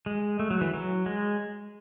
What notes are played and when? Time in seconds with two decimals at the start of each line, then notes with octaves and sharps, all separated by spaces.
0.06 G#3
0.39 A3
0.51 F#3
0.61 E3
0.74 F#3
1.06 G#3